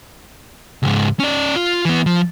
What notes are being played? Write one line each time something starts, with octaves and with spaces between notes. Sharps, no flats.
C#2 G#2
C#4 D5
F4
E3 B3
F3